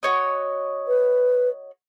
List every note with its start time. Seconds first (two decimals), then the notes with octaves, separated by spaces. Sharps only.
0.03 F#4 C#5 D#5
0.88 B4